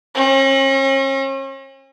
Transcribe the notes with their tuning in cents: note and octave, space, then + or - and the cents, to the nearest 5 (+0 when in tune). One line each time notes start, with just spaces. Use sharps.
C#4 -45